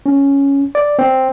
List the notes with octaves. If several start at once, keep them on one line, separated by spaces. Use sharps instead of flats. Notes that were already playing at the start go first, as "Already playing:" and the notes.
C#4
D5
C4